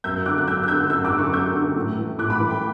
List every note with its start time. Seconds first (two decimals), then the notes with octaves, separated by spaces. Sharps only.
0.04 F#2 E6 G6
0.26 D3 D6 F#6
0.38 F#6
0.47 F#2 E6 G6
0.63 F#6
0.68 D3 E6 G6
0.90 F#2 E6 G6
1.05 D6 F#6
1.12 D3
1.18 C#6 E6
1.33 F#2 E6 G6
1.55 D3
1.76 A2
1.98 E3
2.18 A2 D6 F#6
2.30 B5 D6
2.40 E3
2.50 G5 B5